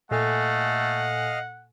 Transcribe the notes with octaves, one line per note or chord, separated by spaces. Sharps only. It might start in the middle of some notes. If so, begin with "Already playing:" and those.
A#2 A3 A4 D#5 F5 F#5 G#5